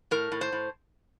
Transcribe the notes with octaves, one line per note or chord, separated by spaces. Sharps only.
A2 A#4
A2
C5
A2